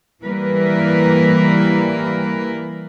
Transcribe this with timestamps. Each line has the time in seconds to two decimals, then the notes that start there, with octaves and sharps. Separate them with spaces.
0.23 E3 G3 A#3 A#4 B4